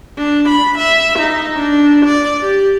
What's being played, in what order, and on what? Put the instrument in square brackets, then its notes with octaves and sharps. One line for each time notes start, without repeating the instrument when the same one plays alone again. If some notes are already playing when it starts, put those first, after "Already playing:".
[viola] D4
B5
E5
D#4
D4
D5
G4